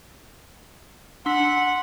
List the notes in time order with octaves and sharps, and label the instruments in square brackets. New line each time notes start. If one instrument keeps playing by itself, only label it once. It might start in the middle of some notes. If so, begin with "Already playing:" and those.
[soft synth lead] D4 [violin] F#5 [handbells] C6 E6 B6